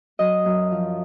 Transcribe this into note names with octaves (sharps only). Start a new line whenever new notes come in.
F#3 D#5
F#2
F3